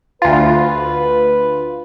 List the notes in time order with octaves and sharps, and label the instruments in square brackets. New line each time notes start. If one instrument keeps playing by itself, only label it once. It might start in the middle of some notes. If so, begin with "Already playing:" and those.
[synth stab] D2 F4 [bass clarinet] B4